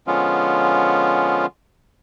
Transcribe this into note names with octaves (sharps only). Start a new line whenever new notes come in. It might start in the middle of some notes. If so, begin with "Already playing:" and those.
D3 F3 G#3 B3 C#4 F4